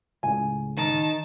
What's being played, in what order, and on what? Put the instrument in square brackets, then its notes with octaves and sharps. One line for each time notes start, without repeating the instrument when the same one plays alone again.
[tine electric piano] C#2 A2 C#3 [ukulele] G#5
[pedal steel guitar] D#3 D#4 [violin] A5